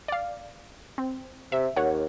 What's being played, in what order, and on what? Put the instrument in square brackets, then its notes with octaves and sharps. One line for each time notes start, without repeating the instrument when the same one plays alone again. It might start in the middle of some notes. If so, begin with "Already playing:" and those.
[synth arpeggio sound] D5 F5
C4
[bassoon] C3 [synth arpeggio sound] E5
[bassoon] D#2 [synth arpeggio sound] C#5 F#5